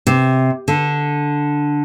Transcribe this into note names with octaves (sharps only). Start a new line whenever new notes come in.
C3
D3